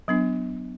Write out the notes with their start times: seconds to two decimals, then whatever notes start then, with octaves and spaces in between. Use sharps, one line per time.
0.08 F#3 B3 D4